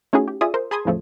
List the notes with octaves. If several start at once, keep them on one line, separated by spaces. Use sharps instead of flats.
A3 C#4 D#4 E4 F#4 G#4
G4
F4 G#4 D5 E5 D#6
A#4 C5
G#4 A5 B5 C6 D#6 G#6
E2 A2 C#3 F3 A3